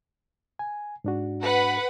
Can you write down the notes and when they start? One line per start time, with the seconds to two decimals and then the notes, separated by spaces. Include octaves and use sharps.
0.59 G#5
1.04 G#2 D4 F#4
1.42 B4 F#5 B5